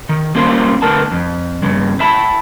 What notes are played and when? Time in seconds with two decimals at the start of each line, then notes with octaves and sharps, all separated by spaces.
0.09 D#3
0.35 G3 A#3 C#4 F4 A#4 C5
0.82 D3 A3 B3 A#4 A5
1.11 F2
1.62 G2 C#3
2.00 E5 A5 B5